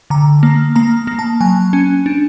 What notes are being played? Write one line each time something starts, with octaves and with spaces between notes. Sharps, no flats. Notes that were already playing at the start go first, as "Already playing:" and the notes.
D3 A#5
A#3
A#3 A#5
A#3
A5
F#3 G#5
C#4
D4